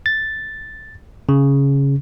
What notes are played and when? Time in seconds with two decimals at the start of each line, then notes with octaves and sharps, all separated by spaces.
0.06 A6
1.29 C#3